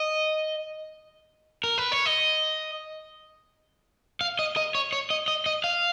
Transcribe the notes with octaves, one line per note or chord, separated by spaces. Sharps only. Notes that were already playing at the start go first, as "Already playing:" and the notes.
Already playing: D#5
A#4
B4
C#5
D#5
F5
D#5
D#5
C#5
C#5
D#5
D#5
D#5
F5